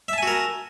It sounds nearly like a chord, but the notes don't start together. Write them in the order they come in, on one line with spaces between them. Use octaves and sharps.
E5 A5 G#5 F#4 A#4